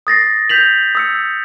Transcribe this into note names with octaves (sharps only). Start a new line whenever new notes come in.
D#6 A6 A#6 C7
G6 B6 F7 F#7
D#6 E6 C#7